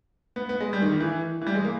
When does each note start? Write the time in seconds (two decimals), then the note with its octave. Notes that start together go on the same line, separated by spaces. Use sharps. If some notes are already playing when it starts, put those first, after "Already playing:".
0.36 B3
0.49 B3
0.60 G#3
0.73 G3
0.82 D#3
0.92 D#3
1.01 E3
1.42 E3
1.47 G3
1.55 G#3
1.65 A#3